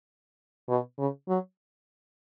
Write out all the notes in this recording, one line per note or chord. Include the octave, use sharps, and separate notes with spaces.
B2
C#3
F#3